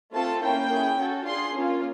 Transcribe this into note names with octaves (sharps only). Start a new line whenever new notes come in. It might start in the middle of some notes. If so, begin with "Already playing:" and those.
A3 C4 F4 A4 A5
A#3 C#4 E4 G5
C#4 E4 G#4
C#4 F#4 A4
D4 F4 G#4 C6
A#3 C#4 F4